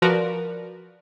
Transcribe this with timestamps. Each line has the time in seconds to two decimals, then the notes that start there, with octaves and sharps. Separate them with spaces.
0.02 F3 F#4 A#4 B4 D5